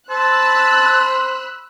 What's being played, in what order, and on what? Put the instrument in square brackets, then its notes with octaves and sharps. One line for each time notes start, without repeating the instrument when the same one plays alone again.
[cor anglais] C5 [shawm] A5 [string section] B5 E6 F#6